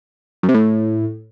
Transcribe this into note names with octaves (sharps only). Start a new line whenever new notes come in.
F#2
C3
A2